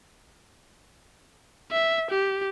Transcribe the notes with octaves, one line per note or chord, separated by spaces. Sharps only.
E5
G4